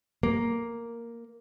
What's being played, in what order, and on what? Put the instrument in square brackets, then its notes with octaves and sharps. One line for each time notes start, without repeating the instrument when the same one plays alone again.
[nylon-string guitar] A#3